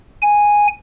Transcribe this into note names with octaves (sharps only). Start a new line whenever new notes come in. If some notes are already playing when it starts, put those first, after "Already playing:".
G#5